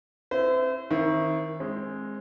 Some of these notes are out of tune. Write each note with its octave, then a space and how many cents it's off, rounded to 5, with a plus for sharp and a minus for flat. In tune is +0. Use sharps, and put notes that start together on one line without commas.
C4 +25 E4 +0 C5 -40
D#3 +20 C4 +30 E4 +0
G#3 +0 C4 +25